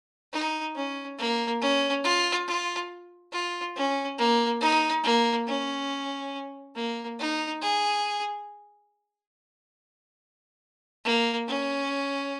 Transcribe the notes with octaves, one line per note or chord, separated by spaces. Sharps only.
D#4
C#4
A#3
C#4
F4
F4
F4
C#4
A#3
D#4
A#3
C#4
A#3
D#4
G#4
A#3
C#4